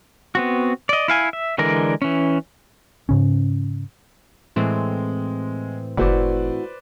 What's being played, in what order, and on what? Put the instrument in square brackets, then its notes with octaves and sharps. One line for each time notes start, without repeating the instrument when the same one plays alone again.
[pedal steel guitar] B3 C4 F#4
D5 D#5
E4 F5 G#5
E5
D3 E3 G#3 A#4 D5
E3 C#4
[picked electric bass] G#2 C#3 C#4
[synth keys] A2 E3 C4 [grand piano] G#3
[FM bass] F#1 [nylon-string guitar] A3 E4 F#4 [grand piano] B4 C5 D5